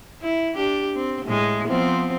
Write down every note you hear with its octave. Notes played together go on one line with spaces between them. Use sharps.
E4
D4 G4
C4
A2 G#3
F3 B3 C4